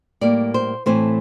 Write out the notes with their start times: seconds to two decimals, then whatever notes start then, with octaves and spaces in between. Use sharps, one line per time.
0.21 A2 G3 A#3 D5
0.54 C5
0.86 A2 E3 A3 C4 C5